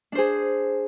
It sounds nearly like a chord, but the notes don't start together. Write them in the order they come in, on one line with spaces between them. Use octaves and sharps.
D4 C5 G#4